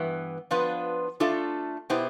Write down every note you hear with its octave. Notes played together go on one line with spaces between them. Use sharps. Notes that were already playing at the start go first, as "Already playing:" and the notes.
Already playing: G2 E3 B3
F3 B3 D4 F4 B4
A3 D4 F4 A4 E5
B2 B3 E4 G4 C5